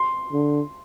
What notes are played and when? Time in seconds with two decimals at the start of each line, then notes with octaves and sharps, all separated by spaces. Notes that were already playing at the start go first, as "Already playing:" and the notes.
Already playing: C6
0.32 D3